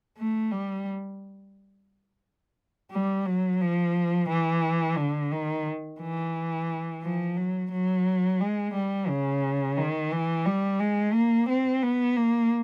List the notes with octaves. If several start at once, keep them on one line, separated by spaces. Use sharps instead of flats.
A3
G3
G3
F#3
F3
E3
D3
D#3
E3
F3
F#3
F#3
G#3
G3
C#3
D#3
E3
G3
G#3
A#3
C4
B3
A#3